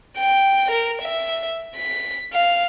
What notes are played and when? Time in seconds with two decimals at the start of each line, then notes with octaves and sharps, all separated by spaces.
0.18 G5
0.71 A#4
1.02 E5
1.77 B6
2.33 F5